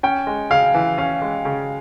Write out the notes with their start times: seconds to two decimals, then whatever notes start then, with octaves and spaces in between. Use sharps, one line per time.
0.03 C#4 G5
0.27 G#3
0.51 C#3 F5
0.74 E3
0.98 C#4 F5
1.22 G#3
1.45 C#3